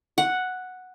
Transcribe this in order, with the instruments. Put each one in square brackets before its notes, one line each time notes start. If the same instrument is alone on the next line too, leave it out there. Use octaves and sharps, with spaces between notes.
[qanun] F#5